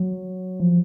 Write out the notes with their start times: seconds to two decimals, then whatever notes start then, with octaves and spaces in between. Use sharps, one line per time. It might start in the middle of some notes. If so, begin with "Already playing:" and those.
Already playing: F#3
0.60 F3